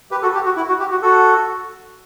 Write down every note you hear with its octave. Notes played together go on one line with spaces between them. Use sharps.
G4 B4
F#4 A4
G4
F#4
E4
F#4
G4
F#4
F#4 A4